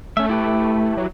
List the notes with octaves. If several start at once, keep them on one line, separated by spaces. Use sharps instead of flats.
A3 C#4 E5
E4 G4 B4
F#3